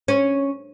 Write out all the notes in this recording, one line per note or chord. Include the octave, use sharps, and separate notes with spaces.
C#4